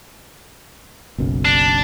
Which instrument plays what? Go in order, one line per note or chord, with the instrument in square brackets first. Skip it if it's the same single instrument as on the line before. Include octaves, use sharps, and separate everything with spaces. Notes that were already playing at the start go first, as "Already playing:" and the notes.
[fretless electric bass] F#1 B1 F#2
[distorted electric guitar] D4